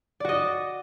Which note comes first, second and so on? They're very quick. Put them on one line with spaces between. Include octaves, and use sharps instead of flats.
D5 F#4 D#5